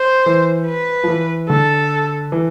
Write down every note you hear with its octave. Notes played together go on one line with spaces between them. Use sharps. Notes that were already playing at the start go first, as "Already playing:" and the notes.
Already playing: C5
E3
B4
F3
E3
D3 A4
E3